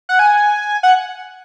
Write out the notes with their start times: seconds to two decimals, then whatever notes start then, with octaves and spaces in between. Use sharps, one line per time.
0.09 F#5
0.19 G#5
0.83 F#5